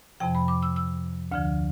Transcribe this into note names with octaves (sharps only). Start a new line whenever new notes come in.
F2 C3 F3 G5
B5
D6
E6
E6
D2 D3 F3 F6